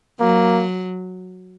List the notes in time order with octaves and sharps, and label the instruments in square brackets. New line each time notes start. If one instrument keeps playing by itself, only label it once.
[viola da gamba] F#3 [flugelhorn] A#3